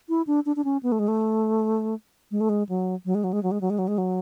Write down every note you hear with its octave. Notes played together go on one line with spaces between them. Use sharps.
E4
D4
D4
D4
C#4
B3
A3
G#3
A3
G#3
A3
G#3
F#3
F#3
G#3
F#3
G#3
F#3
G#3
F#3
G#3
F#3
G#3
F#3